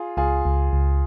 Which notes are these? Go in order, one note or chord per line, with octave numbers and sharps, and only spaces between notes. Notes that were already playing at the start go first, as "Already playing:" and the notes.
Already playing: F4 G#4
C#2 F4 G#4
C#2
C#2